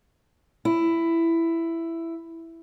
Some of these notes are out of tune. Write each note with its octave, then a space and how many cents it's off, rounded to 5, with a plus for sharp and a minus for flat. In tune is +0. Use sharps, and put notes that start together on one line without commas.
E4 +10